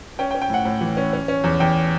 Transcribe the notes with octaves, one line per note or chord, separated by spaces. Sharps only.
C#4 G5
G5
C#4
G5
A2 F#5
A2
E3
C#4
C#4
C#4
E2
E2 G5